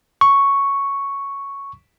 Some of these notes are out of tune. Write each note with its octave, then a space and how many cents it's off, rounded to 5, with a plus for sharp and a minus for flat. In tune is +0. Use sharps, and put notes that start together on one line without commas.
C#6 +0